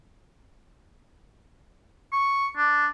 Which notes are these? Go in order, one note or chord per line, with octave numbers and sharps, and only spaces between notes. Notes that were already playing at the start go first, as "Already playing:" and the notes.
C#6
D4